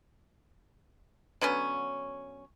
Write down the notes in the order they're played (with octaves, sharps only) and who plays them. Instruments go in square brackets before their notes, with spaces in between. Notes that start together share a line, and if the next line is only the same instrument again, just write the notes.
[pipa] D3 F#3 B3 C#4